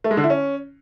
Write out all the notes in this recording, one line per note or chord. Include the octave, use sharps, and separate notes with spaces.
A3
G#3
D3
E4
C#4